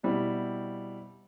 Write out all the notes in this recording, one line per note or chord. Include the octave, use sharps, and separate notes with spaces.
B2 G3 C4 E4